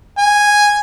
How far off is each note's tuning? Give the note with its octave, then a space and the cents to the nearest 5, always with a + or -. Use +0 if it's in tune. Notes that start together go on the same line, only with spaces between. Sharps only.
G#5 -5